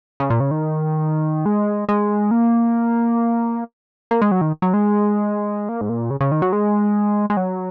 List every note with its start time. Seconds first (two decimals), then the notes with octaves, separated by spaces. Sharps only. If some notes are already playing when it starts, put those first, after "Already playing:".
0.20 C#3
0.30 A#2
0.40 C#3
0.51 D#3
1.46 G#3
1.89 G#3
2.31 A#3
4.11 A#3
4.22 G#3
4.31 F#3
4.41 D#3
4.62 F#3
4.74 G#3
5.69 A#3
5.81 G#2
5.89 A#2
6.10 C#3
6.21 C#3
6.32 D#3
6.42 F#3
6.53 G#3
7.30 G#3
7.37 F#3